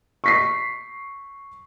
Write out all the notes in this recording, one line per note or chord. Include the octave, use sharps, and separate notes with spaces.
C#6 B6 C7